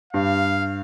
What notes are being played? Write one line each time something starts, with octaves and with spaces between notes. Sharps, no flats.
G2 F5